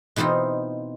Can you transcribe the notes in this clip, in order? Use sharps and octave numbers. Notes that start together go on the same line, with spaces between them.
B2 E3 C4 D#4 F4